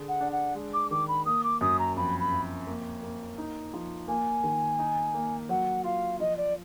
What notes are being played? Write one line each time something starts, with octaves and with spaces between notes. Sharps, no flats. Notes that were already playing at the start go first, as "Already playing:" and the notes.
Already playing: D3 G#4
F#5
D4
F#5
G#3
D6
D#3 D6
B5
A#3 D#6
D6
F#2 D#6
A#5
F2 B5
B5
F2
A#3
A#3
D#4
F3
A#3 G#5
D#3
D#4
A#3
F#3 F#5
F4 F5
F3 D#5
D5